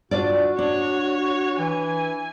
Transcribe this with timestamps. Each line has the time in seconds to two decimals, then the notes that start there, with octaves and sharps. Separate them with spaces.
0.11 D4 F4 F#4 D5
0.59 D4 C#5
1.58 E3 G#5